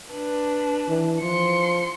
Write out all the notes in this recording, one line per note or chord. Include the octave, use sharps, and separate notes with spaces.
D4 B4
E3
F3 C6 C#7